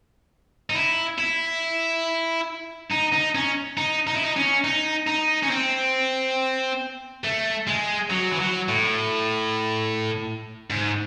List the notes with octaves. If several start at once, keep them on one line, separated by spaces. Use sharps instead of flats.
D#4
E4
E4
D#4
D#4
C#4
D#4
D#4
E4
D#4
C#4
D#4
D#4
C#4
C4
A3
G#3
F#3
E3
F#3
A2
G#2